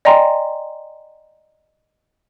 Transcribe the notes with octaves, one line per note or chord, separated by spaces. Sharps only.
D5 D#5 G5 G#5 A#5 C6